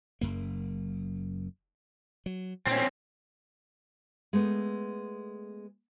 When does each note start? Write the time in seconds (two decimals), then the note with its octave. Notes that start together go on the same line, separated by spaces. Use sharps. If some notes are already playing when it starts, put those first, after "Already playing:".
0.21 F#1 F#2 A#3
2.26 F#3
2.67 A#2 C4 C#4
4.33 G#3 A3 B3